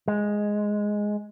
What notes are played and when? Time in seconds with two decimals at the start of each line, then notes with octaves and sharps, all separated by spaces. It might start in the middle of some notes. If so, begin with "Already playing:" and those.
0.08 G#3